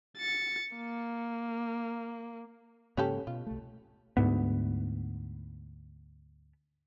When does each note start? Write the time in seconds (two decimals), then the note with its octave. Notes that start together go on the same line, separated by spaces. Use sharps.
0.17 A6 C#7
0.76 A#3
2.97 G#2 C#3 A#3 C#4 G4 A4
3.27 B2 F4
3.47 C2 A3
4.17 D2 G#2 B3